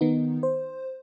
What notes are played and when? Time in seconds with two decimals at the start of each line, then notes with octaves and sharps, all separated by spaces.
0.01 D#3 B3 D#4
0.43 C5